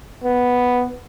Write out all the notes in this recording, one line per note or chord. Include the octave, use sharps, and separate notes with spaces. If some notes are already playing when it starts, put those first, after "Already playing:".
B3